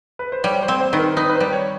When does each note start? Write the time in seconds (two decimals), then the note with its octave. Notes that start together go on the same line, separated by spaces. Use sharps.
0.19 B4
0.32 C5
0.44 G3 C#5
0.62 C5
0.68 C4
0.80 C5
0.93 D#3 B4
0.99 A#4
1.17 D#4 B4
1.30 B4
1.34 C5
1.40 G3
1.52 C#5